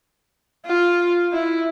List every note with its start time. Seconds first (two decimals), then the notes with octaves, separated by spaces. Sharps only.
0.65 F4
1.33 E4